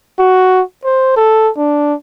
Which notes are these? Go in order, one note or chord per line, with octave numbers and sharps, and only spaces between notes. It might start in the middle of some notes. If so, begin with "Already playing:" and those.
F#4
C5
A4
D4